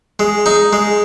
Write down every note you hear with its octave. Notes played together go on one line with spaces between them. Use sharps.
G#3
D#4
G#3